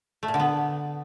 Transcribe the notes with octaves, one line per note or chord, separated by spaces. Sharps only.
A3
A#2
D3
B3